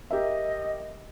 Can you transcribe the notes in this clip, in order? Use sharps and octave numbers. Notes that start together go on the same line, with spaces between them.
G4 A#4 D#5 E5